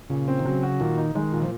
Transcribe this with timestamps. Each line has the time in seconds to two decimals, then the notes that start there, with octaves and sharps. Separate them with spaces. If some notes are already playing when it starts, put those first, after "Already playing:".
0.10 A#2 C#3
0.28 C4
0.39 D#3
0.45 C#3 F#3
0.63 F#4
0.80 A#2 D#3
0.97 D#4
1.15 D#3 G#3
1.32 A#2
1.42 F3